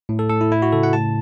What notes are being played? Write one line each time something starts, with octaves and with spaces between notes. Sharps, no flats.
A2
A4
A2 A4
E4
A3 E4
F#4
C#3 A4
F#5
A2 A5